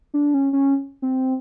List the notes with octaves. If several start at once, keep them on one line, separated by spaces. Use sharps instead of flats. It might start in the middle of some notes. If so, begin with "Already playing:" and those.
D4
C#4
C#4
C4